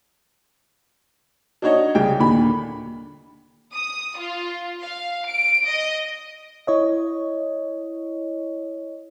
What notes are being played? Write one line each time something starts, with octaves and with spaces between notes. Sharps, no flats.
D4 D#4 F#4 C#5 D#5
C2 C#3 G5
D#2 A#2 D3 B5
D#6
F4
F5
D7
D#5
E4 C#5 D#5